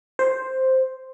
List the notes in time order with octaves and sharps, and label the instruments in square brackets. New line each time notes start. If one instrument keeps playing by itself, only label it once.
[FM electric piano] C5